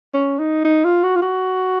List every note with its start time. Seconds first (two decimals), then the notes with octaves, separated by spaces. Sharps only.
0.14 C#4
0.39 D#4
0.65 D#4
0.85 F4
1.04 F#4
1.16 F4
1.22 F#4